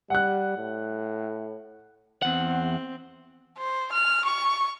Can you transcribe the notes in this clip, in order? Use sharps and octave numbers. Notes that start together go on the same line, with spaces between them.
G3 F#5 F#6
A2
E2 C4 F#5
C5
F6
C#6